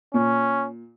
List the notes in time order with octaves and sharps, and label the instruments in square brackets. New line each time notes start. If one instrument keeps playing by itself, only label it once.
[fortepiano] A#2 [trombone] C#4